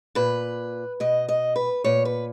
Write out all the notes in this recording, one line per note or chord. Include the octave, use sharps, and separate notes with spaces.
A#2 B4
B2 D#5
D#5
B4
A#2 C#5
B4